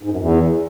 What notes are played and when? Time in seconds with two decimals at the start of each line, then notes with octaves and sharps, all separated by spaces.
0.03 G#2
0.11 F#2
0.18 E2